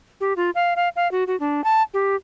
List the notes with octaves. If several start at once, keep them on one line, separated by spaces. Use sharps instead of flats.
G4
F4
F5
F5
F5
F#4
F#4
D4
A5
G4